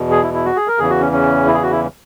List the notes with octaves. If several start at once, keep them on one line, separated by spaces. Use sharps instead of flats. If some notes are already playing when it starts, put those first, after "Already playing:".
Already playing: E2 B2
G#4
E4
E4
F#4
G#4
A#4
E2 C#3 E3 G#4
F#4
C#4
C#4
E4
G#4
F#4
E4